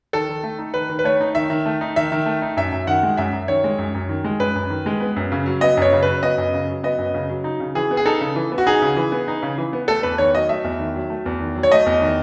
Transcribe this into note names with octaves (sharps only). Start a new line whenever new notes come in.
D#3 A4
D#3
A3
D#4
D#3 B4
D#3
B4
A3 C#5
D#4
D#3 E5
D#3
A3
D#4
D#3 E5
D#3
A3
D#4
F#2 E5
F#2
D#3 F#5
G#3
F#2 E5
F#2
D#3 C#5
G#3
F#2
F#2
D#3
G#3
F#2 B4
F#2
D#3
G#3
B3
F#2
C#3
F#3
B3 D#5
F#2 C#5
C#3
B4
F#3
B3 D#5
F#2
C#3
F#3
B3 D#5
F#2
C#3
F#3
D#4
C#3
E3 G#4
B3
G#4
D#4 A4
C#3
E3
B3
F#4
D#4 G#4
C#3
E3
B3
D#4
C#3
E3
B3
A3 A4
E2 B4
D#3 C#5
F#3 D#5
A3 E5
E2
D#3
F#3
A3
E2
D#3
F#3
C#5
A3 D#5
E2
D#3